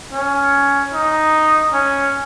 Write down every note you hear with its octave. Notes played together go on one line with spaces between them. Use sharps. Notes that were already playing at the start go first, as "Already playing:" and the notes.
C#4
D#4
C#4